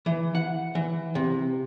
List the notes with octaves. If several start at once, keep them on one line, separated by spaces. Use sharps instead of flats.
E3
F#5
E3
C3